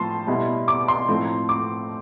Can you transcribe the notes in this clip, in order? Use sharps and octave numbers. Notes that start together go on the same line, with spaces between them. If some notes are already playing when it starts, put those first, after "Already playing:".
Already playing: A2 F3 A5 C6
B2 G3 B3 E4
D6
C6
A2 F3 A3 C4
D6